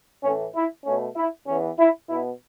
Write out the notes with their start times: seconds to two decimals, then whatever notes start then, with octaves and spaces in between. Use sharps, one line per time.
0.23 A2 E3 A3 C#4
0.54 E4
0.85 B2 A3 C#4
1.16 E4
1.47 E2 E3 B3 C#4
1.78 E4
2.09 B2 B3 E4